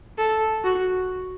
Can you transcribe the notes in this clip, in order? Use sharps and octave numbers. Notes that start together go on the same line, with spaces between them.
A4
F#4